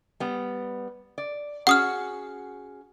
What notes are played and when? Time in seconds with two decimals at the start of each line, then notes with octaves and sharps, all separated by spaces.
0.20 G3 B3
1.18 D5
1.67 C#4 F#4 G#4 F#5 D#6 F6